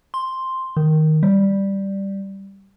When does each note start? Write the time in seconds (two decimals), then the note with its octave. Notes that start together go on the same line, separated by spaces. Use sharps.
0.14 C6
0.77 D#3
1.23 G3